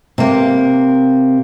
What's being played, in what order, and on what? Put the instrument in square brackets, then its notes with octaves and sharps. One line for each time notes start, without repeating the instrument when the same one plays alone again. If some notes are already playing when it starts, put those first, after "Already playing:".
[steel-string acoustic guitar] C3 A#3